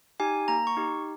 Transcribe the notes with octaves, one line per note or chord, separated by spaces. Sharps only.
D#4 G4 G#5
A#3 A#5
C#6
D#4 G4